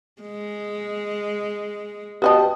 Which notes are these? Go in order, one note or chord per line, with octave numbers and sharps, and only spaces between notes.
G#3
B3 F#4 G4 D#5 G5 A5